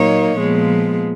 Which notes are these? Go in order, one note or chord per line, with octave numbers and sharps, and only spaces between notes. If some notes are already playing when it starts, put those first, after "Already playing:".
Already playing: A#2 F#3 A#3 D#4 C#5
A#2 F3 G#3 B3